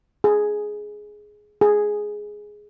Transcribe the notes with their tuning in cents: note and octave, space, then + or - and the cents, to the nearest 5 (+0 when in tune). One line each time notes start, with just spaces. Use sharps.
G#4 +10
G#4 +5